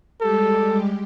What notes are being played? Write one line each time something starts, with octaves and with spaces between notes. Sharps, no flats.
G3 G#3 G4 A4